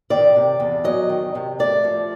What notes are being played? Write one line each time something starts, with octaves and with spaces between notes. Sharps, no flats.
D#3 D5
C3
E2
F#3 D#5
D#3
C3
A3 D5
F3